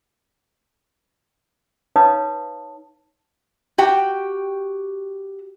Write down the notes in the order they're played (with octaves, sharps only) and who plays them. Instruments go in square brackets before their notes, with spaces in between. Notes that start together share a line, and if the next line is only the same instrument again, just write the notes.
[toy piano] D#4 B4 C#5 F5 A5 D#6
[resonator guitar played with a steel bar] F#4 G4 G5